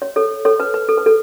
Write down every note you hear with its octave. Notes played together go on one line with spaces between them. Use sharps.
C#5
A4 C#5
A4 C#5
B4
B4
A4
B4
A4